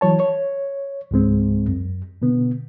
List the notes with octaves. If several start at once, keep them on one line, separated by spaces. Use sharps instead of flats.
E3 F#3 C#5 A5
C#5
C#2 G#2 G#3 C4
F#2
B2 D3 B3